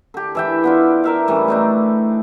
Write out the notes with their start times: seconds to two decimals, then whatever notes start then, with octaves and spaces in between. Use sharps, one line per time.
0.14 D3 G4
0.35 E3 E5 G5
0.64 B3 D4 F4
1.04 A#4 E5 F5
1.28 A2 E3 G3 C#4
1.48 A3 D4 D#4